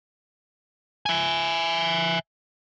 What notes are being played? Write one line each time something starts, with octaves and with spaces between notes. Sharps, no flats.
E5 G#5